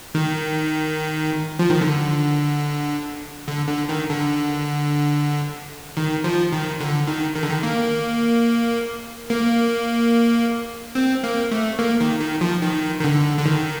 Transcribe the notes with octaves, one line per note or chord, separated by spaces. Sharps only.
D#3
F3
D#3
D3
D3
D3
D#3
D3
D#3
F3
D#3
D3
D#3
D#3
D3
D#3
A#3
A#3
C4
A#3
A3
A#3
D#3
D#3
F3
D#3
D#3
D3
D3
D#3